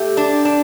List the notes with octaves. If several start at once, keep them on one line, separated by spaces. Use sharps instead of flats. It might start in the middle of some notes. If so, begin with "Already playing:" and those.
Already playing: A3 G4
D4
D4